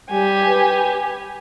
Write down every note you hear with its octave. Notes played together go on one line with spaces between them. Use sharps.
G3 G4 G#5
B4